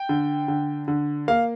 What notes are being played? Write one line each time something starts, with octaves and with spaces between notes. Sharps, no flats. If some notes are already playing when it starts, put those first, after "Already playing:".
Already playing: G5
D3
D3
D3
A#3 F5